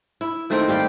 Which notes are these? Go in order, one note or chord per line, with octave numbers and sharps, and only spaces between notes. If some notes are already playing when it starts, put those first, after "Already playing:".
E4
D#3 A3 A#3 C4
G3 G4 F5 G5